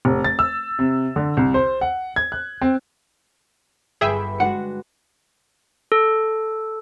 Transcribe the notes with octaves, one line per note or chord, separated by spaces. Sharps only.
F1
A6
E6
C3
D3
C2
C5
F#5
G#6
F#6
C4
G1 G#4 B4 E5 G5
G#3 D4 F#4 F#5
A4